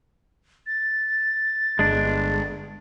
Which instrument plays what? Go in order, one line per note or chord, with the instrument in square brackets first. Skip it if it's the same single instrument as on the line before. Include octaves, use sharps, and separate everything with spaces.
[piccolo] A6
[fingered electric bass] G1 [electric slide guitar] G#3 D4